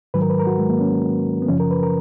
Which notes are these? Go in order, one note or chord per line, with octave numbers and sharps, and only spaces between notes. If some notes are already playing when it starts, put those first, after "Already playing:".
G#2 D#3 F#3 B4
A#4
B4
A#4
F#4
G#3
A#3
C#4
B3
F#2 C#3 F3 C#4
A#4
B4
A#4